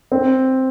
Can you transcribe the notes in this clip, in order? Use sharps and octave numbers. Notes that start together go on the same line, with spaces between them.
C4